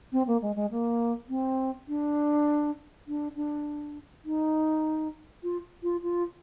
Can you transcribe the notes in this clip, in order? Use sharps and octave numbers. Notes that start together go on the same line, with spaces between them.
C4
A#3
G#3
G#3
A#3
C4
D4
D4
D4
D#4
F4
F4
F4